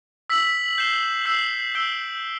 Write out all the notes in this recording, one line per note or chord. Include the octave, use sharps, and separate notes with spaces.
E6 B6 F#7
G6 C7 E7 G7
E6 G6 C7
E6 G6 D7 G7